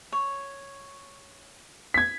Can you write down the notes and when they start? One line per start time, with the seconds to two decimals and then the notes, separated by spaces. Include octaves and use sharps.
0.12 C#5
1.94 G#6 B6